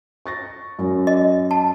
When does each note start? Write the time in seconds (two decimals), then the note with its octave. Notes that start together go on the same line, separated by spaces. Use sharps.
0.26 C#6 A6 A#6
0.79 F#2
1.07 D#5
1.51 A5